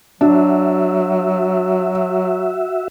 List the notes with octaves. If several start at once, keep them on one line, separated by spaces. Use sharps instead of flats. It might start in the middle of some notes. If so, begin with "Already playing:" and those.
F#3 D4 F#4 E5